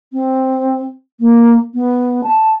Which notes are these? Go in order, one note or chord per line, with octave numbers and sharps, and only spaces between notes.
C4
A#3
B3
A5